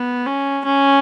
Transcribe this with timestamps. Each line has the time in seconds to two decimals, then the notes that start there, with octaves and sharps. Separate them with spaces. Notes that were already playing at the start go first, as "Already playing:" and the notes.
Already playing: B3
0.26 C#4
0.65 C#4